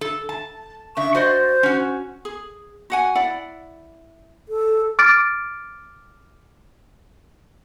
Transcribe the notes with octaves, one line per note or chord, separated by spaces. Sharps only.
A4
A5
C#3 D4 E5 C#6
F#4 C5 D5 D#5
C#4 F#4
G#4
F#4 F#5 G#5
E4 D5 F#5
A4
D6 F6 A6 D7